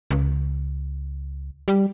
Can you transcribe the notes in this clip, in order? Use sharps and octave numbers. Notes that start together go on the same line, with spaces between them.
C#2
G3